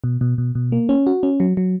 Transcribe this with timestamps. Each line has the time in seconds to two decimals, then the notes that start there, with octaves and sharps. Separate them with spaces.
0.04 B2
0.21 B2
0.38 B2
0.55 B2
0.72 A#3
0.89 C#4
1.07 F#4
1.23 C#4
1.40 F#3
1.57 F#3